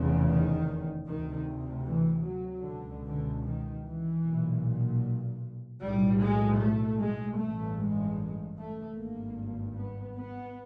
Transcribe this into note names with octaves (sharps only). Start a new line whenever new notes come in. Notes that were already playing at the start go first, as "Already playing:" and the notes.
Already playing: F1 E2 C#3
D#3
D2 C3 D#3
E3
F#3
C#2 B2 D3
D3
D#3
E3
B1 A#2
B1 A2 G3
G#3
A3
G#3
A1 G2 A3
G#3
A3
G#1 G2 A#3
B3
B3